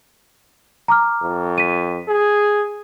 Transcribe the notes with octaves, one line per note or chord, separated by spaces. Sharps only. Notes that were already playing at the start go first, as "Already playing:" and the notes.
A#5 D6 F6
F2
B6 D#7
G#4